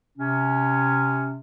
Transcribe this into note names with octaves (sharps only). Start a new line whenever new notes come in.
C3 C#4